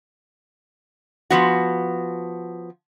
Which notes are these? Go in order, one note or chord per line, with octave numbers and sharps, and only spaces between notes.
F3 B3 F#4